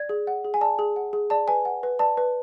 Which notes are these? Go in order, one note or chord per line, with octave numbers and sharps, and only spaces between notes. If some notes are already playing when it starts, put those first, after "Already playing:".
Already playing: D5 G#6
G#4
F#5
G#4
G#5
D5 A5
G#4
F#5
G#4
D5 A5
B4 G#5
F#5
B4
D5 A5
B4